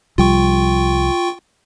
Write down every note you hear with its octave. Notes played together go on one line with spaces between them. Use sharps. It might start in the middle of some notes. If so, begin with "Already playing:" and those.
C2 F3 G3 F4 G5 C#6